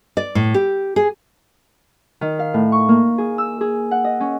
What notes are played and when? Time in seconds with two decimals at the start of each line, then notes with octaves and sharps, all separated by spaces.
0.17 D5
0.35 A2
0.54 G4
0.96 G#4
2.21 D#3
2.39 F5
2.54 A2
2.72 C#6
2.89 A#3
3.18 G#4
3.38 E6
3.61 G#4
3.91 F#5
4.04 D#5
4.20 C#4